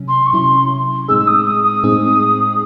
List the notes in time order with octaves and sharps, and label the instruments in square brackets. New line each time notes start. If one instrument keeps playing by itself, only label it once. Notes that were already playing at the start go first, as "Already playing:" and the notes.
Already playing: [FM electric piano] C3 F#3 C#4
[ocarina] C6
C#6
[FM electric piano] C3 F#3 C#4 E4 [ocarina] C6
[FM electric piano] A2 G#3 C4 D#4 G#4 [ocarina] E6
[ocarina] E6
D#6
D#6
D#6
[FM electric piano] A2 G#3 C4 D#4 G#4